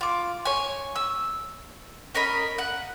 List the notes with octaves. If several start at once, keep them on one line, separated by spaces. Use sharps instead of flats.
F4 D6
C#5 G#5
E6
C#4 A#4 D#5 B5
F#5